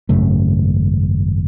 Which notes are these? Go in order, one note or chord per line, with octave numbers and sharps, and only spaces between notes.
G#1 F#2 C#3 A3